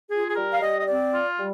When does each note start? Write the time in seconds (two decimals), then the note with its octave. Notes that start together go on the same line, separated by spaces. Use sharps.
0.10 F4 G#4
0.28 G#4
0.36 G3 A#4
0.52 F5
0.61 G3 D#5
0.80 D#5
0.87 C4 D5
1.12 F4
1.37 G3